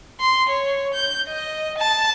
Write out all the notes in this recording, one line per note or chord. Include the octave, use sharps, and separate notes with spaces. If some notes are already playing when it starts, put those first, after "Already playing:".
C6
C#5
G6
D#5
A5